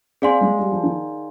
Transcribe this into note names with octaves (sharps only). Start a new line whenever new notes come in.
C4 G#4 D5 F5 G#5 C6
G#3
G3
F3
D#3